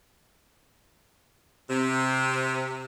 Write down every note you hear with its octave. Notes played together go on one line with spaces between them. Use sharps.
C3